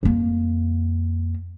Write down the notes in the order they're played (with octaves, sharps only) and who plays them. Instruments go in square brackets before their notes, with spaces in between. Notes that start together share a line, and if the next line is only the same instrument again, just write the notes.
[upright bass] F2 A#3